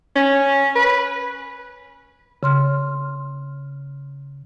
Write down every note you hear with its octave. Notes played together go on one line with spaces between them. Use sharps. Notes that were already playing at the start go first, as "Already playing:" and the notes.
C#4
B4
C#3 C6 F6